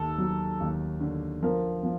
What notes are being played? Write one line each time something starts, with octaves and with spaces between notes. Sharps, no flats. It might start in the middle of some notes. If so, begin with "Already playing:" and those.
Already playing: D#2 A4
F#3
D#2
D3
F3 A#4
F3